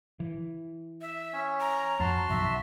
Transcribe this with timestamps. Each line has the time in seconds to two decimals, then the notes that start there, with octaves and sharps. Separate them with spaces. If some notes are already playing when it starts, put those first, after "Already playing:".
0.20 E3
1.01 E5
1.33 C#4 C#5
1.60 A#5
2.00 F2 F#4 A5 C6
2.29 B1 F#2 D#3 E5